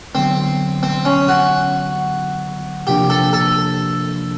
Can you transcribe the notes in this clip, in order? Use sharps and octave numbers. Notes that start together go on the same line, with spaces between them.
D3 F#3 B3 C4
C4
C#4
F#4
C3 F3 A#3 D4 G4
A4
A4